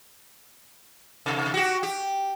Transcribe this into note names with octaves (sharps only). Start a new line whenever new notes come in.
C3
F#4 G4
G4